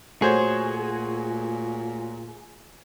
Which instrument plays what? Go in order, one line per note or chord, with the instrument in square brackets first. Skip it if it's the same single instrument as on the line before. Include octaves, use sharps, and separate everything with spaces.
[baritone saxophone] A#2 [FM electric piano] A3 [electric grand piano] F#4 C5 C#5 [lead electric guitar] G#4